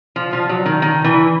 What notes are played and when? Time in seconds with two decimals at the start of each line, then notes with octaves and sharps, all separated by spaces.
0.16 F3
0.33 F3
0.49 F#3
0.66 D#3
0.82 D#3
1.04 E3